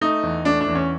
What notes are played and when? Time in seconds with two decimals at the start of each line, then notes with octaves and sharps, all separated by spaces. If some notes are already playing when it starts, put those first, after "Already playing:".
0.01 A3 D#4
0.23 E2
0.45 A3 D4
0.61 D4
0.68 E2
0.75 C#4